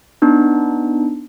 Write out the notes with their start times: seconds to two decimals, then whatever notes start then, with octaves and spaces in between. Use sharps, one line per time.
0.22 B3 D4 D#4